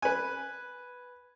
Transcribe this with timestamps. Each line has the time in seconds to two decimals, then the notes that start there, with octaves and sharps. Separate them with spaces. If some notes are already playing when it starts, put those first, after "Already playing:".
0.02 B4 G#5